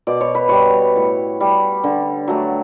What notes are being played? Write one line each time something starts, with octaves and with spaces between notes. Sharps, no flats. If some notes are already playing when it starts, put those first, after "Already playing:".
B2 D5
C#5
B4
G3 C#5
A2
G3
D3
F#3 A3